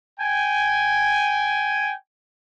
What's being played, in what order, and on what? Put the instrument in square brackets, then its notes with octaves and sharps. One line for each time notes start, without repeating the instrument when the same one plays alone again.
[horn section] G5 G#5